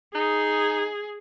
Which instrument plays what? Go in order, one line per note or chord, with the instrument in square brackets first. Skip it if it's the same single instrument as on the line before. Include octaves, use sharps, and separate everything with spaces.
[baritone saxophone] D#4 [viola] G#4